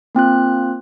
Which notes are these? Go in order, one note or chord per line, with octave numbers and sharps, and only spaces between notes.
A#3 C4 F4 F#6